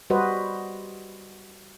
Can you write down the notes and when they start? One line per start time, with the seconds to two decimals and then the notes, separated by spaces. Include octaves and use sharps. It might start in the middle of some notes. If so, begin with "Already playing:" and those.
0.10 G3 F#4 B4 C5 D#5